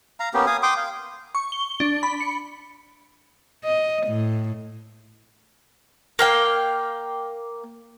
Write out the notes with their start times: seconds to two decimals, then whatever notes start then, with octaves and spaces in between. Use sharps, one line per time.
0.20 F5 A#5
0.34 A#3 B3 C#4 G4
0.47 F5 G#5 D#6
0.63 G5 C6 D6 D#6
0.77 F5
1.35 C#6
1.52 G7
1.80 D4
2.03 B5
2.20 C#7
3.64 D#5
4.07 A2
6.19 A#3 F5 G5